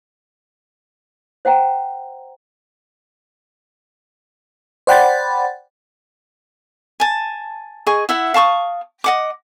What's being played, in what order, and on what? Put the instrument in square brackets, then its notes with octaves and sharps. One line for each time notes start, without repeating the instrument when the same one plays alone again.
[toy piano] C5 F#5 G5 A#5
[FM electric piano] C5 D5 F#5 G5 B5 A6
[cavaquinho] G#5 A5
G#4 D#5 C#6
E4 E5 F#5
F5 A5 C#6 D#6
D#5 F#5 D6